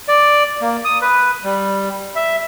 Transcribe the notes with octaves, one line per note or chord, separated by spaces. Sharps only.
D5
A#3
D#6
B4
G3
E5